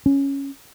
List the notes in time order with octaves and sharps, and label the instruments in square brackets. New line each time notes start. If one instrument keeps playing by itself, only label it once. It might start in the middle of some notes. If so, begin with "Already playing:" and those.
[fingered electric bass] C#4